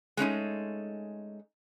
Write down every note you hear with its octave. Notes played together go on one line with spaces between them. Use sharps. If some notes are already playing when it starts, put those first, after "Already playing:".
G#3 A3 C#4 D#4